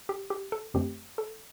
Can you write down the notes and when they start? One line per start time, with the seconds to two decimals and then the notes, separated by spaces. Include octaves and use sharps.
0.09 G4
0.30 G4
0.52 A4
0.74 F#2 D3 A3 C4 G4
1.18 A4